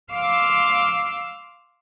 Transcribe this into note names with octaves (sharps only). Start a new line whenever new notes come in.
F5 C6 D6 E6 F6